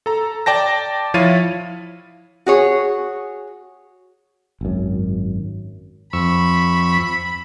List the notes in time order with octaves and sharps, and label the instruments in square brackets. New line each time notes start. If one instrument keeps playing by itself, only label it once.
[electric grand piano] A4 A#5
D5 G5 A5 A#6
F3 E4 C#5 F5 A6 D#7
[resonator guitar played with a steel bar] F#4 G#4 C#5
[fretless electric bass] G#1 F#2
[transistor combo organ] F2 C#6 E6 [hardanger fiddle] B5